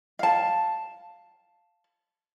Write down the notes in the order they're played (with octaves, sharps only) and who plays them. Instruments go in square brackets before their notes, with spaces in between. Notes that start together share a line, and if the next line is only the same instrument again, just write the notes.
[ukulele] F5 A5